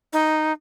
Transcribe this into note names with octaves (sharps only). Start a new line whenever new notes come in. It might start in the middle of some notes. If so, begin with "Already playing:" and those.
D#4